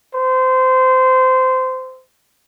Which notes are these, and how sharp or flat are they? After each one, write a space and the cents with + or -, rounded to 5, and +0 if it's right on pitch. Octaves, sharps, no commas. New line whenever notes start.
C5 -20